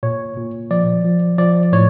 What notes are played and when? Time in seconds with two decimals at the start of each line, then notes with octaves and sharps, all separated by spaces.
0.03 A#2 C#5
0.37 A#2
0.71 F3 D5
1.04 F3
1.38 F3 D5
1.72 A2 C#5